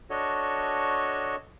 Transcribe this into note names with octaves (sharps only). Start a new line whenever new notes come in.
D4 F#4 A4 C#5 D#5